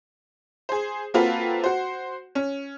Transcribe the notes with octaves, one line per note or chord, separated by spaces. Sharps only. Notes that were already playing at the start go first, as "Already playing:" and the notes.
G#4 C5
A#3 C4 F4 F#4 A4 B4
F#4 C5
C#4